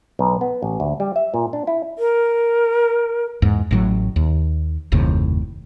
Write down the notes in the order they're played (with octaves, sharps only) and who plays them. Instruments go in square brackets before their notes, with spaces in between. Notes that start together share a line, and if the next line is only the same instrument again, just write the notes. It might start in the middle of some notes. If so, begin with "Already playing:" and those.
[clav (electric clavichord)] B1
B3
A1
D2
G3
E5
A#2
D4
E4
[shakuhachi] A#4
[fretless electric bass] E2 G#2
A1 A2 F#3
D#2
F#1 D#2 A2 C3